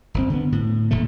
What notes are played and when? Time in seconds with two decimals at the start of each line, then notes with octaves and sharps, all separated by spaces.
0.14 G1 B2 C4
0.30 D3 B3
0.52 A2
0.91 D#1 A#2 D3 A3